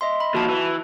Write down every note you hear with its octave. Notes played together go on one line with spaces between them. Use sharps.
D#5 E5 C6
B5
D#2 F3 F#4 A5
E3